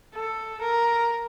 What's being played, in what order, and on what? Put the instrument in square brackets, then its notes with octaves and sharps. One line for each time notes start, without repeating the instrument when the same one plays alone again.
[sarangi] A4
A#4